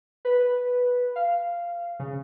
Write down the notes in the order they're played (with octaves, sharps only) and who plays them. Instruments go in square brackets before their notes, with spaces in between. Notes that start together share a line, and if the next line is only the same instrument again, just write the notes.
[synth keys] B4
F5
C#3